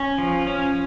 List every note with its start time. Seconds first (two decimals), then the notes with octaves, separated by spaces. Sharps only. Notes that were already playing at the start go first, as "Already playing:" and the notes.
Already playing: C#4
0.18 F3
0.47 C#4